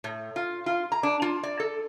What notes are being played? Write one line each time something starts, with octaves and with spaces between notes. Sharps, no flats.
A2
F4
F4
A#5
D4
F4
D5
A4